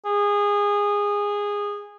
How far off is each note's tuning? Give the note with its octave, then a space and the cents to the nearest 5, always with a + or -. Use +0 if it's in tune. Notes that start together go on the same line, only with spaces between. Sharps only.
G#4 -20